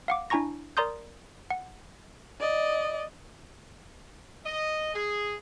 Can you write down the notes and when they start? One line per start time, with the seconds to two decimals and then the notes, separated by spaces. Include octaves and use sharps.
0.08 F5 F#5 D6
0.30 D4 E4 G#5 A#5 C#6 A#6
0.77 A#4 D5 A#5 C6 D#6 G6
1.50 F#5
2.40 D5 D#5
4.46 D#5
4.94 G#4